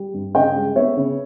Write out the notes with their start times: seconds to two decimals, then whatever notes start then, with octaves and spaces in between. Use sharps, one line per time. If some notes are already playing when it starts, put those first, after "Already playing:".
Already playing: G3
0.14 G2
0.35 C#3 D#5 G5
0.56 G#3
0.75 B3 C#5 E5
0.96 C#3